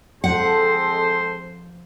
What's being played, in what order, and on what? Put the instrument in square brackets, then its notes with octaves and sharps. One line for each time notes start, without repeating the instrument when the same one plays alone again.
[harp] F3 [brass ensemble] G#3 C4 A4 [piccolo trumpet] C5 [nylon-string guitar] F#5